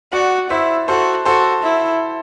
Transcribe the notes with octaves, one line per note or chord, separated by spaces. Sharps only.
F#4 D5 F#5
E4 C5 E5
F#4 A4 C5
F#4 A4 C5
E4